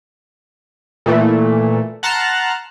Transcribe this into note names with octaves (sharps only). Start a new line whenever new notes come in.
A#2 E3 A3
F#5 A5 A#5 C6 F6 F#6